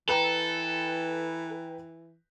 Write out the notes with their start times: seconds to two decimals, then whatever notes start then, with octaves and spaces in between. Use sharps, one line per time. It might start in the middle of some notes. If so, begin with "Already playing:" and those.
0.09 E3 A4 B4 G5 A#5